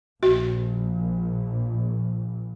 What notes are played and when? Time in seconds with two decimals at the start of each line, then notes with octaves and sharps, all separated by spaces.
0.23 A#1 F#4